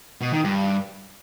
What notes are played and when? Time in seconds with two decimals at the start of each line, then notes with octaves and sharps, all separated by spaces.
0.21 B2
0.33 D#3
0.44 G2